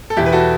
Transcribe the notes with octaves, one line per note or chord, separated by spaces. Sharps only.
A4
E2 B2 E4 G4
B4
F#4 A4